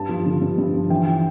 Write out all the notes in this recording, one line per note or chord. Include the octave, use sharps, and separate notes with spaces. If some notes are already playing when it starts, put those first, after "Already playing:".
Already playing: G2 A5
F3
D3
G2
G2
F3
E3 G5
G5